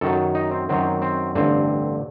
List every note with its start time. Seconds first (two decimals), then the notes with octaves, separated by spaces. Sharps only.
0.01 F#2 D#3 F#3 A4
0.35 D#4
0.52 C4
0.69 F#2 D#3 F#3 C4
1.02 C4
1.35 A1 G2 D3 C4